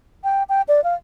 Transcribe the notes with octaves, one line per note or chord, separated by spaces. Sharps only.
G5
G5
D5
F5